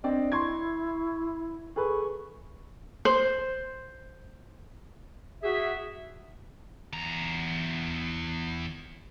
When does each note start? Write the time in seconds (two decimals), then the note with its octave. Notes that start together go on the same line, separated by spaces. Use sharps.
0.04 C4 D4 D5 D#5
0.32 E4 C6 C#6 G#6
1.76 G#4 A4 B4 C#6
3.05 C5
5.43 F#4 G#4 E5
6.93 E2 A#5